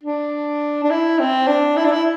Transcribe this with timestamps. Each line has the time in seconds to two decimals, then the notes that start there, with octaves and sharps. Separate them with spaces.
0.04 D4
0.83 D4
0.90 E4
1.19 C4
1.47 D4
1.76 E4
1.85 D4
1.92 E4